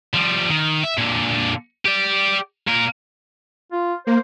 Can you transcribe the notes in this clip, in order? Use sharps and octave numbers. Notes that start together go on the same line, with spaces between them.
F3 G3
D#3
E5
A#2 D3
G4 D5
A#2 A#4
F4
A#3 C5